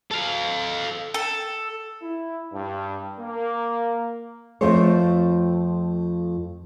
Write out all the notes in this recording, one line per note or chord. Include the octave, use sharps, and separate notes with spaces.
A4 F5
A4
E4
G2
A#3
F2 F3 A3 C4 C5 C#5